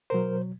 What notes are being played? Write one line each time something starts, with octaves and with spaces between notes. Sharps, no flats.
B2 F#3 A#4 C5